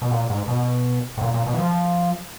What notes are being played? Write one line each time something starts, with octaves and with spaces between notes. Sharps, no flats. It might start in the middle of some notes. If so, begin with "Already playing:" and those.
B2
A#2
G#2
B2
A2
A#2
A#2
B2
E3
F3